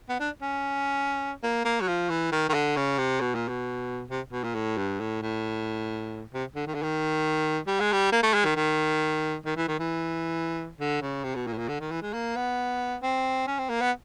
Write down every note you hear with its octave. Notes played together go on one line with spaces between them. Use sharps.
B3
D4
C#4
A#3
A#3
F#3
F3
E3
D#3
D#3
D3
C#3
C3
B2
A#2
B2
C3
B2
A#2
A2
G2
A2
A2
C3
D3
D#3
D3
D#3
G3
G#3
G3
A#3
A3
G#3
D#3
D#3
D#3
E3
D#3
E3
D3
C#3
C3
B2
A#2
A2
A#2
D3
D#3
E3
G#3
A#3
B3
C4
C#4
C4
A#3
B3